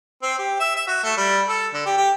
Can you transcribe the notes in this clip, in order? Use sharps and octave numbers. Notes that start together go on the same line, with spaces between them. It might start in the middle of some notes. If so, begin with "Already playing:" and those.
C4
G4
E5
E5
F#4
A3
G3
A4
D3
G4
G4